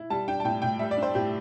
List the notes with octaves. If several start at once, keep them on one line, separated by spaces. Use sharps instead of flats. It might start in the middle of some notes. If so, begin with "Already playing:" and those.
Already playing: E4
G3 A5
D4 G5
A5
A2 G5
A2 G5
G3 E5
D5
D4
C5
A2 G4